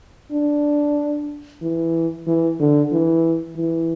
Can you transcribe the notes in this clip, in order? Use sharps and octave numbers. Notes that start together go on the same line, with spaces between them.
D4
E3
E3
D3
E3
E3